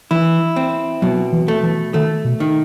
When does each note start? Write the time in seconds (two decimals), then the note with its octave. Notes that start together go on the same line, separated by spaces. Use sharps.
0.11 E3 E4
0.56 C4
1.02 B2 F#3
1.32 E3
1.48 A3
1.63 E3
1.94 D#3 A3
2.24 B2
2.40 D#3